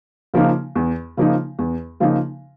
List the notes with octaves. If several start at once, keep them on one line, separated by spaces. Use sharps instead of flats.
C#3 F3 A#3 D#4
E2
C#3 F3 A#3 D#4
E2
C#3 F3 A#3 D#4